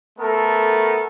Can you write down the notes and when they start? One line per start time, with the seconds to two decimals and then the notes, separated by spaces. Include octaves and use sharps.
0.19 A3 B3 A4 A#4